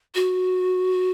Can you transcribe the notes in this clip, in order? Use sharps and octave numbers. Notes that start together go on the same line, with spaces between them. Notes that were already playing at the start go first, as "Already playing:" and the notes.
F#4